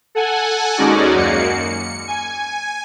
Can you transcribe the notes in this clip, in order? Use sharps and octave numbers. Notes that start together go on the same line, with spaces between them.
A4 F#5 G#5
D#2 G#3 C#4 D#4 F#4 D5
F#2 A#3 C#7
C#7
G#5